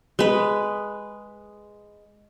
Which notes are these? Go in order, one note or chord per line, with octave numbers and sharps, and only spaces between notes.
G#3 B4